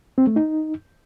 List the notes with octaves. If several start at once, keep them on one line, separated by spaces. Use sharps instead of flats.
C4
A3
D#4